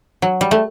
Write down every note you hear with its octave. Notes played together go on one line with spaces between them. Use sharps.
F#3
G3
A3